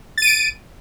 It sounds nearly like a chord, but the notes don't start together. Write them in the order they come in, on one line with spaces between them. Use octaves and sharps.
A6 D#7 D7